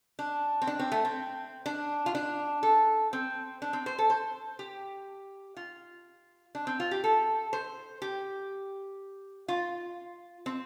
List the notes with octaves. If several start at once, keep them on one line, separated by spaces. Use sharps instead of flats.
D4
C4
D4
C4
A3
C4
D4
F4
D4
A4
C4
D4
C4
C5
A4
C5
G4
F4
D4
C4
F4
G4
A4
C5
G4
F4
C4